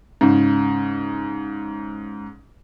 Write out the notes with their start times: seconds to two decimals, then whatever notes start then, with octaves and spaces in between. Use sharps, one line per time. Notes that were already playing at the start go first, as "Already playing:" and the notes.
0.21 G#2 C#3